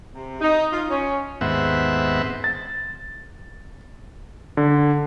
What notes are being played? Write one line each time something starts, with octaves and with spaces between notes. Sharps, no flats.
C3
D#4
F4
C#4
D#2 G#2 B3 C4 E5 F#5
A6
D3